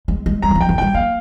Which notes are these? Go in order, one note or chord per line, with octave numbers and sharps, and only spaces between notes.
G#3
G#3
G3 A#5
D#3
F3
G5
D#3
G3 G5
A#3 F5